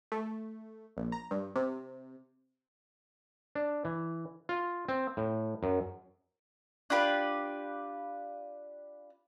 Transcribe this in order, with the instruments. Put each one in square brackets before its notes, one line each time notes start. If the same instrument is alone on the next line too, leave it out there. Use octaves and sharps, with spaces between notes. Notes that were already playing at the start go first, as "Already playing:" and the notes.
[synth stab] A3
A#1
A#5
G2
C3
[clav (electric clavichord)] D4
E3
F4
C4
A2
F#2
[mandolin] D4 F4 G4 B4